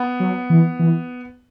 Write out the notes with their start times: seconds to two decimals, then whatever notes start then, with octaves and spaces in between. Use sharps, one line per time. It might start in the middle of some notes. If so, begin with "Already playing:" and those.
Already playing: B3
0.20 F#3
0.50 E3
0.79 E3